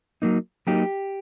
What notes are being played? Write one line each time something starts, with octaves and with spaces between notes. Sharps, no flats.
F#3 A#3 D#4
F#3 A#3 D#4 G4